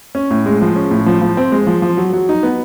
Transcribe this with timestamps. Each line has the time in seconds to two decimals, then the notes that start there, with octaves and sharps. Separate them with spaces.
0.15 C#4
0.31 A2
0.46 G#3
0.62 F3
0.76 C#4
0.91 A2
1.06 F3
1.22 F3
1.37 C4
1.52 G#3
1.67 F3
1.82 F3
1.97 F#3
2.13 F#3
2.29 D#4
2.43 B3